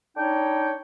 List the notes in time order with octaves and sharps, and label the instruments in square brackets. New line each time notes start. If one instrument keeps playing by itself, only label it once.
[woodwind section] D4 D#4 C#5 G5